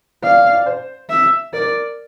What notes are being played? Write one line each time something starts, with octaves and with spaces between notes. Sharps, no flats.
D5 F5
D5
D5
D5
C5
E5
A#4 D5